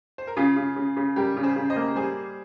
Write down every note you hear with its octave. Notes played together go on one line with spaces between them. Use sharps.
C5
A#4
C#3 F4 G#4
C#3
C#3
C#3
G3 G4 A#4
C#3
G#4 C5
C#3
C5 D#5
A#3
G3 G#4 C5